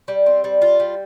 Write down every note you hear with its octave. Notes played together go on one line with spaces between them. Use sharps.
G3
C4
G3
F4
G3